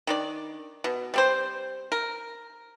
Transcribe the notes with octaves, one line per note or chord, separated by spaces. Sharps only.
D#3 D4 D5
B2
G3 C4 C5
A#4